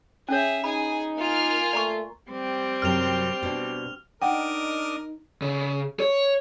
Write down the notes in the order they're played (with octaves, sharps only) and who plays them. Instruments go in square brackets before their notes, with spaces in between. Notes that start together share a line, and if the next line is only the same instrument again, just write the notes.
[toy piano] C#4 C#5 [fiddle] G#4 E5
[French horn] D#4 [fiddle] G#4 G#5 [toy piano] B5
[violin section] A#3 G#5 F6 [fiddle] F4
[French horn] A3 [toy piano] D5 A#5 C#6
[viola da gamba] G3 C4
[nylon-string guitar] F#2 C3 F#3 [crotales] F6 F7
[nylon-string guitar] B2 D4
[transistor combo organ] D4 D#5 [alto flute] D#4 [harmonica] A#4 [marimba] F#5 G5
[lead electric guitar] C#3
C#5